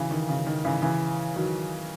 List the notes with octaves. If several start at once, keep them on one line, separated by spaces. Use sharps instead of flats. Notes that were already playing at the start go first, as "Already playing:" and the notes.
Already playing: C#3 E3
D#3
C#3
D#3
C#3 E3
C#3 E3
D#3 F#3